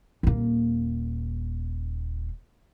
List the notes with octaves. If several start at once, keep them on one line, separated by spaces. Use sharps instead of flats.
D#1 A#3